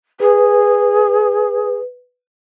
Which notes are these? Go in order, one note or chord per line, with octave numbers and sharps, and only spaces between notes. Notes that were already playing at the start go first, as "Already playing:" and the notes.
G#4 B4